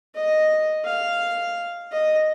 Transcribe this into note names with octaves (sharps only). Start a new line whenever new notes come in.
D#5
F5
D#5